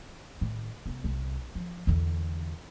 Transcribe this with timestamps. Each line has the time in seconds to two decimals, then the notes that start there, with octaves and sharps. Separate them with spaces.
0.41 A2 D#3
0.86 C3 B3
1.04 C2
1.55 F3
1.87 E2 D3